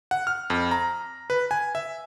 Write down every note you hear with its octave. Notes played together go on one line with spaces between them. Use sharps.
F#5
F6
F2
A#5
B4
G#5
E5